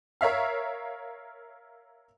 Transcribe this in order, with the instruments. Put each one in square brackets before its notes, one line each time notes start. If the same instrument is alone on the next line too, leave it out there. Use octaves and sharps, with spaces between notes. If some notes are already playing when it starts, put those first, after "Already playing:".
[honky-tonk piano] A#4 C#5 E5 F5